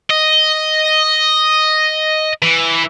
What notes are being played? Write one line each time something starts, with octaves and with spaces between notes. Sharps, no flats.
D#5
E3